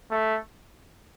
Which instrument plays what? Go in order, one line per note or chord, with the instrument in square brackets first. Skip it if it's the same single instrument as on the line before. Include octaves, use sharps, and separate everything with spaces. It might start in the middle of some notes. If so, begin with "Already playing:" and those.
[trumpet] A3